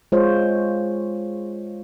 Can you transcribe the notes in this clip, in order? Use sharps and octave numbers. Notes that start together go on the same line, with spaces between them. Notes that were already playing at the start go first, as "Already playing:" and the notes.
G#3 F4 C5 C#5